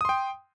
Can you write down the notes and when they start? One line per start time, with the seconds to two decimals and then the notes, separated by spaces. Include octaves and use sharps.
0.01 D#6
0.05 C6
0.09 G5